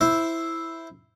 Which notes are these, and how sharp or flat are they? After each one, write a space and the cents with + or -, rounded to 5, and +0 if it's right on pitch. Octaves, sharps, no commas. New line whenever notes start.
E4 +0 C5 +0